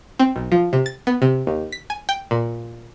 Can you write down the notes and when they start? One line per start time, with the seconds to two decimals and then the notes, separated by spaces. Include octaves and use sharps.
0.19 C4
0.36 B1
0.52 F3
0.73 C3
0.86 A6
1.07 B3
1.22 C3
1.47 D#2
1.72 B6
1.90 G#5
2.09 G5
2.31 A#2